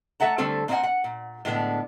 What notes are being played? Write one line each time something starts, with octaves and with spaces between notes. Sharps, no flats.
A3 A4 E5 F#5 A#5
D3 G3 A3 C4 A4 C5
A#3 C4 D#5 F5 F#5 G#5
F#5
A#2
A2 D3 G#3 B3 D4